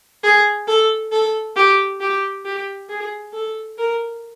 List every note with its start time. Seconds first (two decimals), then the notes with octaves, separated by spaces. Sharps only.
0.23 G#4
0.67 A4
1.12 A4
1.56 G4
2.00 G4
2.45 G4
2.89 G#4
3.33 A4
3.78 A#4